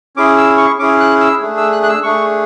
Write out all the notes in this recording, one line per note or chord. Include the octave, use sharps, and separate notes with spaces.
C#4 E4 G#4 D6
E6
C#6
C#4 E4 G#4 D6
F#6
E6
A3 D4 G#4
E6
F#6
F#6
E6
A3 D4 G#4 C#6